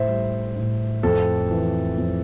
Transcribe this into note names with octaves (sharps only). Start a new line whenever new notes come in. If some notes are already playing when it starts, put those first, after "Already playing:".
Already playing: A2 C5 E5
G3
A2
F2 A4
E3
F2